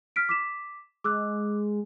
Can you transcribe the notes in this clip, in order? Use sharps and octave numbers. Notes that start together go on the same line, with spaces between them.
F6 B6 D7
D6 B6 E7
G#3 D6 E6 F#6